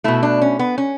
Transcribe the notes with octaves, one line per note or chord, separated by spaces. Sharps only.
B2 A3 E4
D4
C#4
B3
C#4